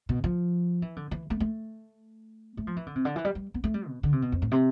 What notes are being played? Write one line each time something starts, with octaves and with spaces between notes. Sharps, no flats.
B2
F3
E3
D3
E3
A3
A3
A3
F3
E3
D3
C3
D3
E3
G3
G3
B3
A3
G3
B2
D3
C3
B2
F2
A2
C3